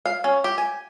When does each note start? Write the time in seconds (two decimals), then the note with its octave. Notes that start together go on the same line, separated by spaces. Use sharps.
0.06 F5
0.24 C#4
0.44 G4
0.58 G#5